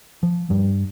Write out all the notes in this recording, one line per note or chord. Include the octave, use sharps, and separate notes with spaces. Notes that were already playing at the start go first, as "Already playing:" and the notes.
F3
G2